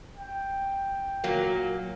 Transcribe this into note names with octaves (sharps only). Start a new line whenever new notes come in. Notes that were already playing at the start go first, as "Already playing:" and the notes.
G5
A#2 F#3 A#3